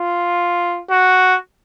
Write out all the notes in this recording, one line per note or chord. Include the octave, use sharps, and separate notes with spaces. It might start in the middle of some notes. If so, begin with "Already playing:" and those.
Already playing: F4
F#4